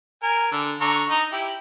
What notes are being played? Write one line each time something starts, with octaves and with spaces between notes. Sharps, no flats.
A#4 G#5
D3
D3 A#5 C#6
D#4 D#5 A#5
E4 G4